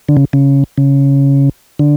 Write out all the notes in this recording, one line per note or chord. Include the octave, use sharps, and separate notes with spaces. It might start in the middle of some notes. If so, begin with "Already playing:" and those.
D3
C#3
C#3
C#3
D3